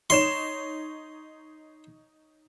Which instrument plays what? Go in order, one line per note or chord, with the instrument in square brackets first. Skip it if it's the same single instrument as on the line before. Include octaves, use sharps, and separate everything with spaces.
[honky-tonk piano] D#4 C#5 E7 [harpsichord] C6